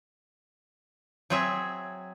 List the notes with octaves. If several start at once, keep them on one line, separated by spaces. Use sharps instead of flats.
F#3 C4 G#4 C#5 E5